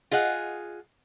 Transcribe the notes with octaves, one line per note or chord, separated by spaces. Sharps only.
F4 G#4 D#5 F#5